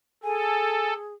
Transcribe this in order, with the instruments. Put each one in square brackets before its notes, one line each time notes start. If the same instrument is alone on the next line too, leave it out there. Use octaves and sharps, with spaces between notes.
[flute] G#4 [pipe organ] A4 [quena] G#5